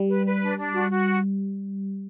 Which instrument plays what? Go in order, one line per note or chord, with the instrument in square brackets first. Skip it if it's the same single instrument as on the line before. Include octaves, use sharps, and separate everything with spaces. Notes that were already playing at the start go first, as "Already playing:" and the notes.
Already playing: [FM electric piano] G3
[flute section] B4
B4
D4
D4
F#4
F#4